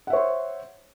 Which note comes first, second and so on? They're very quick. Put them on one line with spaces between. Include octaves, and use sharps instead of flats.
F#5 E5 C#5 C5